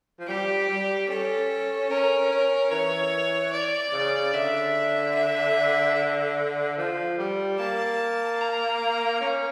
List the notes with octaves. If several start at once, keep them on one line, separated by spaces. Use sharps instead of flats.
F3
G3 G4
G3
C#4 A4
C#4 A#4
C#4
E3 C#5
D5
C#3
D3 E5
E5
F3
G3
A#3 A5
A#5
C#4